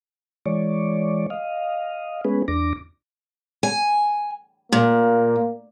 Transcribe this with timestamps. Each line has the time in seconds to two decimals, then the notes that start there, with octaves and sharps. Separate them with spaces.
0.46 E3 G#3 C#5 D5
1.30 D#5 F5
2.25 G#3 B3 C#4 G#4 B4
2.48 E2 D4 D6 A#6
3.63 G#5
4.72 A#2 A#3